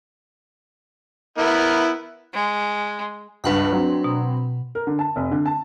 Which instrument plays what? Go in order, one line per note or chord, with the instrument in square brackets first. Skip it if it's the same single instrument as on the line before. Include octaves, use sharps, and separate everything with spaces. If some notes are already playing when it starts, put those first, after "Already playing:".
[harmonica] B3 E4 A#4
[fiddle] G#3
[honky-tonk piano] C#2 G2 [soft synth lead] D4 [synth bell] B4 F#5 B5
[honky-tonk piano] F#3 C4
[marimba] B2
[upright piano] A#4
D3
A5
F1
D3
A5